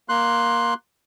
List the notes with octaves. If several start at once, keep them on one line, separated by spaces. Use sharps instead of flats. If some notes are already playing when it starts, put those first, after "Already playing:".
A#3 C6 F#6